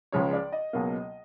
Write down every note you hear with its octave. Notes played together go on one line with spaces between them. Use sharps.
C#2 C#3 F3 G#3 C#5
D5
D#5
C#2 B2 F#3 A#3